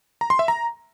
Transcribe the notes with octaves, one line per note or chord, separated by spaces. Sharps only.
A#5
C6
E5
A#5